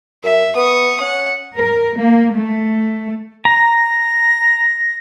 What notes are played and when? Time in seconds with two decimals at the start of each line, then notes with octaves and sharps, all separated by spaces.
0.23 F#2 E5
0.56 B3 C#6 D#6
1.00 C#4 F#5
1.58 A#4
1.97 A#3
2.36 A3
3.45 A#5 A#6